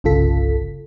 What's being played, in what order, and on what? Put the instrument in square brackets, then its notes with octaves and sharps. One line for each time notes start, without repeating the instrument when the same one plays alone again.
[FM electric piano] G1 C2 C#3 F4 A4 B6